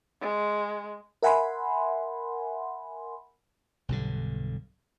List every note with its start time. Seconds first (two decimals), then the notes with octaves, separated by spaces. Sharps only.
0.21 G#3
1.23 A#4 E5 F#5 G#5 B5 C6
3.89 B1 G2 D3